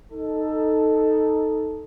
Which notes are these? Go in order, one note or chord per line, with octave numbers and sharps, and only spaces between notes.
D#4 A4